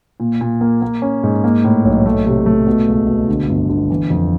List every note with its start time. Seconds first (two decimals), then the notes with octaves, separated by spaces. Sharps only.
0.20 A#2
0.41 A#2
0.61 A#3
0.82 A#3
1.02 C#4
1.23 G#2
1.44 A#3
1.64 A2
1.85 B1
2.06 A3
2.26 C3
2.46 A3
2.67 B2
2.88 C#2
3.07 B2
3.28 D3
3.49 G1
3.69 D3
3.90 E3
4.10 F2